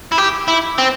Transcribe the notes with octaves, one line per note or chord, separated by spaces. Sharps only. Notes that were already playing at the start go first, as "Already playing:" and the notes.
E4
G4
E4
C4